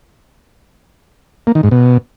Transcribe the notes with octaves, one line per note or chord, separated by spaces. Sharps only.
A#3
D#3
G#2
B2